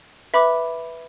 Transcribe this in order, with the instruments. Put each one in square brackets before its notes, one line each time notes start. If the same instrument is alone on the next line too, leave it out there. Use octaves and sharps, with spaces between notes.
[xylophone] B4 E5 B5 D6